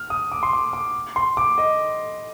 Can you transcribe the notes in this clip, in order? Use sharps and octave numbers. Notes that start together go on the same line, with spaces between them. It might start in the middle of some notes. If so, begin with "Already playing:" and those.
Already playing: F6
D#6
D6
C6
D6
D6
C6
D6
D#5